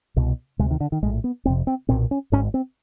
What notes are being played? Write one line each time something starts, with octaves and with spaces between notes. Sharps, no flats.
C2 B2
D2 C3 G#3
D#3
D3
D#3
A#1 A2 G#3
B3
F1 F2 C3 C4
C4
B1 A#2 C4
C#4
G#1 G#2 C#4
C4